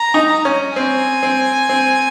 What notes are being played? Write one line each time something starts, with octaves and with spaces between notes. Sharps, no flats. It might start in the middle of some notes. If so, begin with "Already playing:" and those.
Already playing: A#5
D#4
C#4
C4 G#5
C4
C4